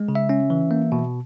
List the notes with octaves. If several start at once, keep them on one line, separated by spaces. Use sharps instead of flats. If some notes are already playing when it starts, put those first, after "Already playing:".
Already playing: G#3
C#3
E5
C#4
E3
A#3
B2